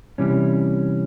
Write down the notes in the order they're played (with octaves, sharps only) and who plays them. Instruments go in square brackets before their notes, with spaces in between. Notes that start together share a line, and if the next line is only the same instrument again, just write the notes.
[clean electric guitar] C3 E3 G3 C#4